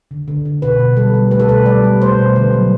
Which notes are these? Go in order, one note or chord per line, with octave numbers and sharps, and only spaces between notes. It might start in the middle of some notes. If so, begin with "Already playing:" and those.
D3
D3
D3
B2 B4
B2
G3 A4
G3
A3 B4
A4
B2 B4
G3 D5
G3
A3 C5
B2
D3 B4
F#3